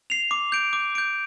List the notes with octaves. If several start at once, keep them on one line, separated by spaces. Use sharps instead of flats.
C7 F7
D6
G6 D7
D6
G6 D7